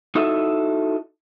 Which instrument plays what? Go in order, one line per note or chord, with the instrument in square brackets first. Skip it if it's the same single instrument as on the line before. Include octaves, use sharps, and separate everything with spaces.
[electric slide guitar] D#4 E4 F#4 A4 D#5 E5